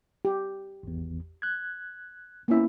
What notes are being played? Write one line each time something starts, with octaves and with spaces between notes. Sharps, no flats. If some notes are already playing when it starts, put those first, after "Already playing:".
G4
G#1 E2
F#6 G#6
A#3 B3 C#4 E4 E5